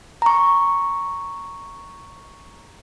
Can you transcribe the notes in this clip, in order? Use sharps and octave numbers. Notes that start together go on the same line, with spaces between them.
A#5 C#6